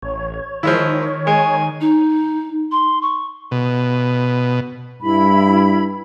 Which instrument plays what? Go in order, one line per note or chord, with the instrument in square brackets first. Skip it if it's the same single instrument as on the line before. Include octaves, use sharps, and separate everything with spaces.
[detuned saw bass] A1 [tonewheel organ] C#5
[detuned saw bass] D#3 [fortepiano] F3 G#3 E4
[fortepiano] G#3 [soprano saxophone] G#5
[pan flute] D#4
C6
C#6
[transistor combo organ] B2
[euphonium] G2 [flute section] E4 B5